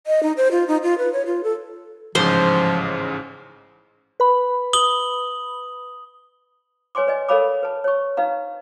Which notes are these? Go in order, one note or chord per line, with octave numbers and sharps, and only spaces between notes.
D#5
D#4
C5
F4
D#4
F4
B4
C#5
F4
A4
A1 G#2 C#3 F3 C5 C6
B4 B5
D#6 F#7 G7
B4 C#5 G#5 C6 D6
B4 D5 D#5 G#5
A4 A#4 C#5 F5 B5 D6
B4 A5
C#5 C#6
D#4 B4 F5 A#5